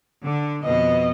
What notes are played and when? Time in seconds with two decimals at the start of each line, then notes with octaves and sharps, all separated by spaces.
0.24 D3
0.64 F2 B2 B3 D#5